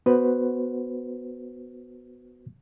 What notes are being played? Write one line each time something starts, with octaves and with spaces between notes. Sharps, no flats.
B3 F#4 B4 C5